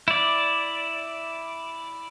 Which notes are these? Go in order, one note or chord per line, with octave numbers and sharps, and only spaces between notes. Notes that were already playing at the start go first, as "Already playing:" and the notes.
E4 D5